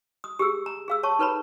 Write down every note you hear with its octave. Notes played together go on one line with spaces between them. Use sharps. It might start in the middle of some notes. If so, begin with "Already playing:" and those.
D#6
G4 G#4 E6
A#5
G#4 F5 E6
C#5 A5 C#6
D#4 A4 B4 C#5 A#5 B5